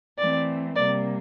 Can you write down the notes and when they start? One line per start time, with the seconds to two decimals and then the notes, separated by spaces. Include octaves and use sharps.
0.18 E3 A3 C4 D5
0.75 C3 G3 A#3 D5